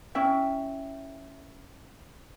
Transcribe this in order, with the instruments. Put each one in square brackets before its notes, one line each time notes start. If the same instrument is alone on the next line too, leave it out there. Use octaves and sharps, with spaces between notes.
[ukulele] C#4 E4 E5 G5